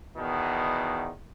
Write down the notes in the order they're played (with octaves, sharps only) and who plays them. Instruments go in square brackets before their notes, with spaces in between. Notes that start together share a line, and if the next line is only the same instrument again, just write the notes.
[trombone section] E2 B2 D#3